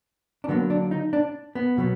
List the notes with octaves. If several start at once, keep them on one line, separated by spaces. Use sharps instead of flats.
D4
D3 F#3 A#3 B3
D4
D#4
D4
B3
B2 F#3 B3